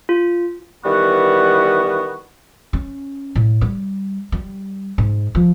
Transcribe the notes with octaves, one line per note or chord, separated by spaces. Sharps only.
F4
D#3 E3 G3 B3 F#4
C#4
A2
G3
G3
G#2
F3